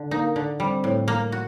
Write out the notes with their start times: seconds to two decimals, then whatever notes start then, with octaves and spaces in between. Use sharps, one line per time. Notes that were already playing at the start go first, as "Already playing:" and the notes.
Already playing: D3
0.11 A#3 D#4
0.36 D3
0.60 G3 C4
0.84 A2
1.08 A#3
1.32 F#4